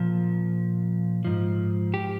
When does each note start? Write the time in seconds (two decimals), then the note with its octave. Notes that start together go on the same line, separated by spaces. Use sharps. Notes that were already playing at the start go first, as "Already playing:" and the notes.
Already playing: A#2 F3
1.25 G#2 F3
1.94 G4